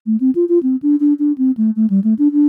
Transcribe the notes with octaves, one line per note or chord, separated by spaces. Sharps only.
A3
C4
F4
F4
C4
D4
D4
D4
C4
A3
A3
G3
A3
D4
D4